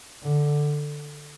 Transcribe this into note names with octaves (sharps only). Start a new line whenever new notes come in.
D3